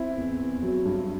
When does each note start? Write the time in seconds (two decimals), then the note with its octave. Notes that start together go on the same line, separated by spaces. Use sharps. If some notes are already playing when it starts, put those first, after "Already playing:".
Already playing: C4 E4
0.16 E2
0.39 E2
0.63 F#3
0.85 G2